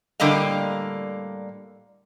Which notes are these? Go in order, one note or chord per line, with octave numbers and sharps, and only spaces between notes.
A2 D3 G3 A#3 D#5 F5